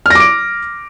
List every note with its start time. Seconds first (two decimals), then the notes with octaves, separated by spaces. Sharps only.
0.06 F6
0.10 A#6
0.15 D6
0.20 D7